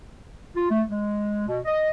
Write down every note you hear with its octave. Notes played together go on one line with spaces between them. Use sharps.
F4
A3
G#3
B2
D#5